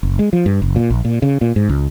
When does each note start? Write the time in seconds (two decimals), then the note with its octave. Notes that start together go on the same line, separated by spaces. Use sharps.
0.03 F#1
0.19 G#3
0.33 F3
0.46 G2
0.62 F#1
0.76 A#2
0.90 A#1
1.05 A#2
1.22 C#3
1.41 A#2
1.56 G#2
1.69 C#2